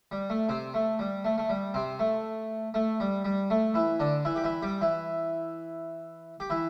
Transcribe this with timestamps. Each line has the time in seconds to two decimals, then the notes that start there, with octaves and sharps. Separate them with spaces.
0.11 G3
0.30 A3
0.49 C3 C4
0.74 A3
0.99 G3
1.24 A3
1.38 A3
1.49 G3
1.74 C3 C4
1.99 A3
2.74 A3
3.00 G3
3.25 G3
3.50 A3
3.74 E3 E4
4.00 D3 D4
4.25 E3 E4
4.36 G4
4.44 E3 E4
4.62 G3 G4
4.81 E3 E4
6.40 G4
6.50 E3 E4